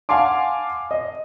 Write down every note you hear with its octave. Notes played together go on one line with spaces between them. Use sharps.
F5 F#5 G#5 A5 C6 D6
D#5